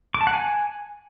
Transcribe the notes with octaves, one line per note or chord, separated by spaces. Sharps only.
D6
A5
F#5
G#5